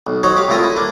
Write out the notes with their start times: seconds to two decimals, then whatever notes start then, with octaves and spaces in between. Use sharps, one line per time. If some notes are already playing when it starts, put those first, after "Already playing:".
0.07 B1
0.23 F#3 D#4 C5 C#5
0.37 G4 F5
0.48 C2 A2 E4 F4 A#4 D#6
0.64 E4
0.76 A#3 D4